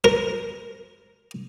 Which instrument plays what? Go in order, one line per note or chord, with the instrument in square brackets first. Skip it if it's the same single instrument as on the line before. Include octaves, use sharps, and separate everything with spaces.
[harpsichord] A#4